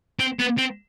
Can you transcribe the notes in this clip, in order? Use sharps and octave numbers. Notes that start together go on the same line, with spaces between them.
C4
B3
C4